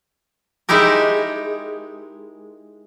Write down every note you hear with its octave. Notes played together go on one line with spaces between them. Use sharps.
G#3 D#4 E4 G4 A#4